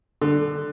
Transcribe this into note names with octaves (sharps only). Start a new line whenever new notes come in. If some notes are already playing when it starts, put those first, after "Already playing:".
D3